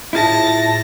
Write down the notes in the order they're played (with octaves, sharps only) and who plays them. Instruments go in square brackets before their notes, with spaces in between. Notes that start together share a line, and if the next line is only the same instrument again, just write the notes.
[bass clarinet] A2 [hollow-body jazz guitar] E4 F4 G#4 [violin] A5 A#6